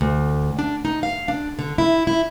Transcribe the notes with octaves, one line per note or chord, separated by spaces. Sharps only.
D2
D4
D#4
F5
D4
D3
E4
E4